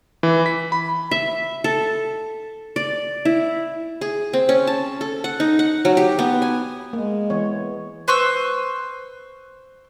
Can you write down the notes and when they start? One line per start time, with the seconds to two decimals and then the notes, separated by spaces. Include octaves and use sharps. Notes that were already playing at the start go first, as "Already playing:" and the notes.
0.23 E3
0.46 B6
0.72 B5
1.11 E5
1.64 A4
2.76 D5
3.25 E4
4.01 G#4
4.33 C4
4.49 C#4
4.67 A5
5.01 A4
5.24 F#5
5.40 D#4
5.59 F#5
5.85 F#3
5.97 G4
6.19 B3
6.42 G#5
6.93 G#3 A#3
7.30 E3 B3 C#5
8.08 B4 C5 C#6 E6